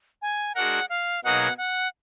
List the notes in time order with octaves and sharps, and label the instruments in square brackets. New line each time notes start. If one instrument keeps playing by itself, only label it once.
[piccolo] G#5
[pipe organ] G#3 D4 F#4 A#4 [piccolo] F#5
[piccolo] F5
[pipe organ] B2 F#3 A#3 D#4 G#4 [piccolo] F#5
[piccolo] F#5